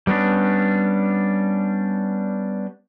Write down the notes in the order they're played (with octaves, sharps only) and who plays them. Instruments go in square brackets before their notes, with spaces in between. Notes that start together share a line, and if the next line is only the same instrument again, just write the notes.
[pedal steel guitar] G3 B3 C#4 D4